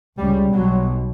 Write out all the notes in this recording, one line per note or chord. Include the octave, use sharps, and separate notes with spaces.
C#2 C#3 G3
B1 B2 F#3